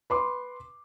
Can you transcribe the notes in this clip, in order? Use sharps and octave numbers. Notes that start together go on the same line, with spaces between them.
B4 C6 D6